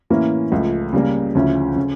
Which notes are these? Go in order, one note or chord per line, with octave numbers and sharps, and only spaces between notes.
A2 E3 A#3 C#4 E4
C#2 C#3 F3 A3
C#3 G3 A#3
D2 C#3 F3 C#4 E4
C#3